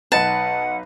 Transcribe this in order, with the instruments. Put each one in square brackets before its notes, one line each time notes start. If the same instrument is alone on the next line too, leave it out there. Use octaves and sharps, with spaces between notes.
[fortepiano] B1 D#4 B4 [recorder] F#5 [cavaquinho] A5